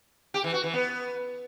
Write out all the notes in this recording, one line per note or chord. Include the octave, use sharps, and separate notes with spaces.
G4
E3
F#4
E3
B3